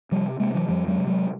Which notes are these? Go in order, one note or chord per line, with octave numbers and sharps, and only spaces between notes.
C3 F3 G3
C3 G#3 A#3
E3 F#3
F2 F3 G3
F#3 G#3
C3
F#3 G#3